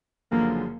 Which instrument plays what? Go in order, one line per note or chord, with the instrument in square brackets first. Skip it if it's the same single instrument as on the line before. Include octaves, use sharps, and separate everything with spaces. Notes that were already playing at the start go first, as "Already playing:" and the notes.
[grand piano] F#1 F#2 D3 F3 G#3 [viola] A#3